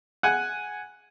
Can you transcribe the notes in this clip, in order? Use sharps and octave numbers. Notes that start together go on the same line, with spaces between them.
F#5 G#5